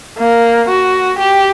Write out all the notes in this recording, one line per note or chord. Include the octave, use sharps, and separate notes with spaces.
A#3
F#4
G4